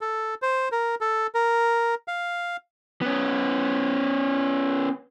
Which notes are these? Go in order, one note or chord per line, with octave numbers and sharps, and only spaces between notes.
A4
C5
A#4
A4
A#4
F5
B3 C#4